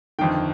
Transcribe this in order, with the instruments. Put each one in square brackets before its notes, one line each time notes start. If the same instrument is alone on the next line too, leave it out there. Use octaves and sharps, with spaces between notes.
[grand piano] G1 F2 D#3 G5